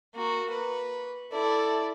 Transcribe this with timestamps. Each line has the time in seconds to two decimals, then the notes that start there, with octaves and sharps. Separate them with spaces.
0.15 A#3 F#4
0.50 B4
1.32 E4 A4 D5